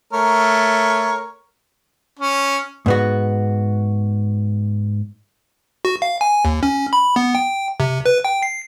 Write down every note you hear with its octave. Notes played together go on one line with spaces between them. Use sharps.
A3 A#4 C#5
C#4
G#2 B3 F#4
F#4
F5
G#5
D#2
C#4
B5
B3
G5
C3
B4
G5
C7